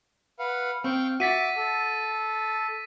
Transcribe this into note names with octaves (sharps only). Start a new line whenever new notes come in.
B4 F5 F#5
C4 F5 G5 C#6
F#4 E5 D6 A6 B6 D#7
A4